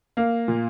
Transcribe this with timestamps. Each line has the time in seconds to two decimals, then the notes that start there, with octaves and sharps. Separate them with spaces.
0.17 A#3
0.48 A#2